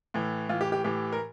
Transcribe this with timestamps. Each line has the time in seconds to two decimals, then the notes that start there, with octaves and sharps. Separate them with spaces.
0.14 A2 E3
0.49 A2 E3 F4
0.61 G4
0.72 G4
0.84 A2 E3 G4
1.12 A#4